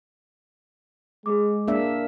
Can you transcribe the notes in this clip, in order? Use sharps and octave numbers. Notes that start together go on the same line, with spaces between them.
G#3 G#4 D6
A#3 D4 E5